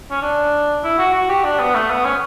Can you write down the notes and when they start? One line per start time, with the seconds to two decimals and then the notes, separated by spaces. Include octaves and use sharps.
0.11 C#4
0.22 D4
0.84 E4
0.98 F#4
1.14 F#4
1.29 G4
1.44 D4
1.59 B3
1.74 A3
1.90 B3
2.05 C#4